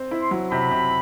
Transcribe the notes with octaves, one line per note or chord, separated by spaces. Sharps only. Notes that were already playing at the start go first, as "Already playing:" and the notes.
Already playing: C4
E4
C6
F#3
C3 B5
C3